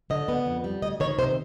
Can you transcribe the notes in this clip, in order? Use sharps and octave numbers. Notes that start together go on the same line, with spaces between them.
D3 D#5
B3
F2
G3
D2 D#5
D#3 C#5
C3 C5